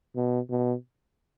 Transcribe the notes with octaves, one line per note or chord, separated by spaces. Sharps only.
B2
B2